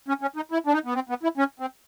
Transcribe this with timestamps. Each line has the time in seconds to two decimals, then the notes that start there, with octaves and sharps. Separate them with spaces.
0.08 C#4
0.22 C#4
0.36 D#4
0.52 E4
0.66 D4
0.72 D#4
0.85 B3
0.95 C4
1.09 B3
1.23 E4
1.37 C#4
1.60 C4